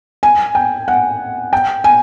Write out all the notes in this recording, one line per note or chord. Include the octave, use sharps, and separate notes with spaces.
G#5
G5
F#5
G5
G#5